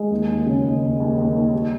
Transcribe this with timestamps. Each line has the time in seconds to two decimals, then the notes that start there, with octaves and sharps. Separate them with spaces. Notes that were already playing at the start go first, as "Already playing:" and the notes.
Already playing: G#3
0.11 D#2
0.29 D#2
0.46 C#3
0.64 D#2
0.82 D#2
1.00 D#2
1.18 D#2
1.35 D#2
1.54 G3